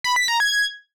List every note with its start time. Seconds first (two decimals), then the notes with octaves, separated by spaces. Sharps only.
0.04 B5
0.16 B6
0.28 A#5
0.40 G#6